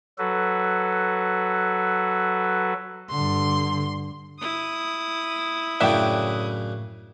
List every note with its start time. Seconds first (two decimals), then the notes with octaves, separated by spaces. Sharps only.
0.18 F#3 F#4 A4 B4
3.10 G2 D3 C6
4.40 E4 D#6
5.80 F#2 A2 C#3 D4 E5 G5 C#6 F#6